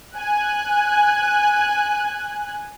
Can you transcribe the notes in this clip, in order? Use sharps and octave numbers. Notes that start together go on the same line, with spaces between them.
G#5 F#6